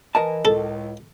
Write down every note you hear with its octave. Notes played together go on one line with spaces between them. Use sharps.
E3 A#4 D#5 A5
C#2 A2 A4